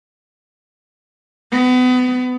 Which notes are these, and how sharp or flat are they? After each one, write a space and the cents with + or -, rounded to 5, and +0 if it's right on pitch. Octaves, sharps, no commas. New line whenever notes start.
B3 +30